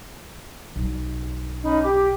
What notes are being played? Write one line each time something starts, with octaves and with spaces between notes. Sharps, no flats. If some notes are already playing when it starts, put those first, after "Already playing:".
B1
C#4 D#4 B5
G4 D6